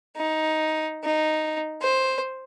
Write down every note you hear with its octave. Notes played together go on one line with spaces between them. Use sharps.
D#4
D#4
C5